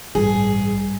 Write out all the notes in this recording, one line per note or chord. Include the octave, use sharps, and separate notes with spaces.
A1 G2 G#4